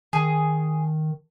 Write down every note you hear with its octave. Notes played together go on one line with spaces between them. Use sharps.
D#3 G#4